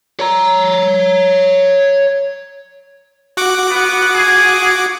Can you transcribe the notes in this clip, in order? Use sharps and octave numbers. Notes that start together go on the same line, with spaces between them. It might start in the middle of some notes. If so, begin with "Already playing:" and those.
C#5 A#5
F#4 F#5 D6
B3
G#4